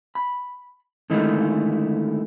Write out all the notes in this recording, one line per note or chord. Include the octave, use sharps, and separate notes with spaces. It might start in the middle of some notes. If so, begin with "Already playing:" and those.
B5
D3 D#3 G#3 A3 D#4 E4